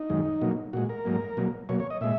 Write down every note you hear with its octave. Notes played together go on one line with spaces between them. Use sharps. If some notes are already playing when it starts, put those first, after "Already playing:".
Already playing: D#4
F#2 D#3 G#3
B2 F#3 A#3
A#2 G#3 F#4
A#4
G#2 F#3 A#3
B2 F#3 A#3
B2 F#3 A#3 C#5
C#5
D#5
A#2 G#3 E5